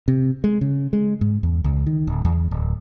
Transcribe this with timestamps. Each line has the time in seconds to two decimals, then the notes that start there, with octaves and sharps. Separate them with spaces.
0.08 C3
0.44 G#3
0.61 C#3
0.93 G#3
1.21 G#2
1.43 E2
1.64 C#2
1.86 D#3
2.07 D1
2.25 E2
2.51 D1